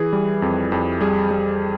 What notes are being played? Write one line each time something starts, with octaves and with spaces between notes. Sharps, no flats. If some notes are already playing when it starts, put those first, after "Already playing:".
Already playing: E3 G#4
G3
F2
F2
G3 G#4
G3